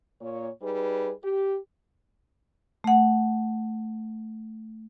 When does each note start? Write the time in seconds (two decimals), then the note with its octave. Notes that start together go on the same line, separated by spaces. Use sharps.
0.21 A#2 C#5
0.62 G3 D#4 G#4 B4
1.24 G4
2.84 A3 F#5